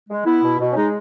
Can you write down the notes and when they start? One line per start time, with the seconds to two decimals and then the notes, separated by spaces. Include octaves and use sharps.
0.09 G#3
0.26 B3 E4
0.43 B2
0.59 B2
0.72 C#4
0.76 G#3 D#4